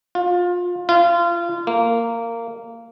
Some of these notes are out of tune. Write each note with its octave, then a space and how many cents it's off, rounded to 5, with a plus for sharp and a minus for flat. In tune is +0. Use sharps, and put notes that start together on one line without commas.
F4 +25
F4 -25
A#3 -15